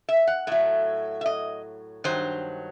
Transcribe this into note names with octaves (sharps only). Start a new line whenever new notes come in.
E5
F#5
A2 F#3 E5
E5
D#5
G2 D#3 F#3 C5